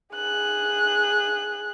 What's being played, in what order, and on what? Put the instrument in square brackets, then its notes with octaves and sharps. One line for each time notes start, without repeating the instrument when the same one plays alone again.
[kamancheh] G#4 F#6